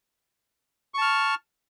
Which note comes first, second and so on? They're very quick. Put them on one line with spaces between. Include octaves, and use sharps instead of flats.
C#6 A5 F6